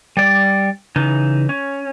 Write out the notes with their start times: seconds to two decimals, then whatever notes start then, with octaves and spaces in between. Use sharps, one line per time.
0.17 G3 D5
0.96 C#3 E3 D#4
1.49 C#4